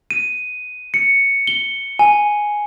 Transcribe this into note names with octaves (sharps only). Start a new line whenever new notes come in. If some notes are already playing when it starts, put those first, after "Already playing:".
D#7
C#7
G7
G#5